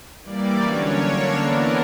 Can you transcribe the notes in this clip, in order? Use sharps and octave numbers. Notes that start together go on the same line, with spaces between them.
E3 G3 A#3 D5
D3 F#3 C#4 C#5
D3 A#3 D4
E3 B3 D4 A#4